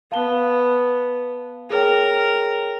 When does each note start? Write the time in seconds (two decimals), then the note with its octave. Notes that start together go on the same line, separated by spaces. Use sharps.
0.12 B3 F5 A5 G7
1.70 G#4 A#4 C#5 G5